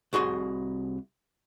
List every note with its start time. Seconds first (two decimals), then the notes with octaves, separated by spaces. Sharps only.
0.13 C2 F#4 G#4 C6